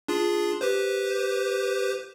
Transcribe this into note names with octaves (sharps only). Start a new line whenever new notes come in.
D4 F4 G#4
G4 B4 C5